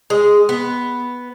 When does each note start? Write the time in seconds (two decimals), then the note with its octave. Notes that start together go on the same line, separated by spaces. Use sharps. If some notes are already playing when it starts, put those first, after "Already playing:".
0.10 G#3
0.49 B3